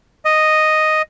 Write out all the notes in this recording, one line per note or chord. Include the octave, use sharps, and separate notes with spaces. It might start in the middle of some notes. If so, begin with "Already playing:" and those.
D#5